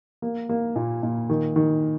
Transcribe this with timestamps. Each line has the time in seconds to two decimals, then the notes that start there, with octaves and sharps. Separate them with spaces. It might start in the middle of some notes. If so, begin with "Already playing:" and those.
0.22 A#3
0.49 A#3
0.76 A#2
1.03 A#2
1.30 D#3
1.56 D#3